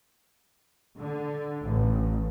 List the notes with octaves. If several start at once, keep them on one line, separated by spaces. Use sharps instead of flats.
D3
A1